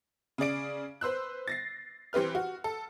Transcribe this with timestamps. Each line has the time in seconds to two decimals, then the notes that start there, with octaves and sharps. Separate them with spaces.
0.38 C#3 G#4 D5 D7
1.01 B4 C5 E6 F#6
1.48 A6 A#6 C7
2.13 E3 C4 G4 B4 F6
2.35 F#4
2.64 A4